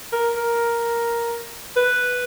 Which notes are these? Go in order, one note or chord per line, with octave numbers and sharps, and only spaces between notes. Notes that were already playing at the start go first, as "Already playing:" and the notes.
A#4
A#4
B4